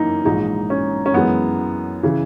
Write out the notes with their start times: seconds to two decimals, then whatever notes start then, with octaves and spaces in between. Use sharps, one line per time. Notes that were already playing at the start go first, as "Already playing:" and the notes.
Already playing: F#2 E3 A#3 D#4
0.25 A#1 G#2 E3 G#3 D#4
0.70 C#4
1.06 C#4
1.14 F#2 E3 G#3 B3
2.03 C#3 E3